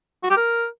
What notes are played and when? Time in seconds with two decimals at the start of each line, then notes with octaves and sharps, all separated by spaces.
0.23 F#4
0.30 G4
0.37 A#4